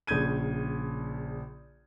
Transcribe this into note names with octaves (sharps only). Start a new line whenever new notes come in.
A#1 C#3 G6 G#6 D#7